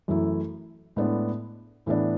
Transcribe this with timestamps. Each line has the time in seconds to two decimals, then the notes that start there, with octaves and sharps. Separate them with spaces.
0.08 F#2 E3 A3 E4
0.96 A2 G#3 B3 D4
1.86 A2 E3 B3 D4